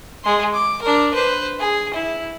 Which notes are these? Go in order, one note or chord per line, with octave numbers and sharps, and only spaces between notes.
G#3 C6
D6
D4 A#4
B4 C5
G#4
E4